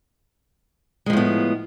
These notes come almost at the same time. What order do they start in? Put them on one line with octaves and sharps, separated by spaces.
G#3 F3 A2 B3